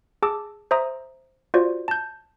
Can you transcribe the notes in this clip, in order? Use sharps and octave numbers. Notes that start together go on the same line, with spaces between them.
G#4 A5 D6 E6
C5 E5 A#5 D#6
F4 F#4 C5 D5
A5 G6